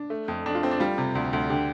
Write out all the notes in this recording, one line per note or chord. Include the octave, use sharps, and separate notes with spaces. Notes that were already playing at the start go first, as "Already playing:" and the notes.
Already playing: D4
A3
F2
F2 D4
F4
A3 C4
D4
G3 F4
C3
D2
D2
D3 G4